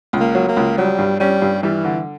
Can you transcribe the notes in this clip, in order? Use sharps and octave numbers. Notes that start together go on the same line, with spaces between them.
C#2
A#3
F#3
A#3
C#2
F#3 G3
G2
G3 C#4
G2
E3 G3
D3